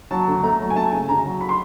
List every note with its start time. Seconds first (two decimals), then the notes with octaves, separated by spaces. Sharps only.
0.11 F#3 A5
0.28 D2
0.43 A3 A#5
0.60 F#3
0.70 G#5
0.76 A3 A5
0.92 C#3 G#5
1.08 D2 A#5
1.25 F#3
1.41 B5
1.49 C6